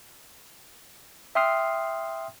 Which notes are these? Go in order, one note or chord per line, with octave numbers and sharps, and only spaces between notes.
E5 G5 C6 D#6 F6 C7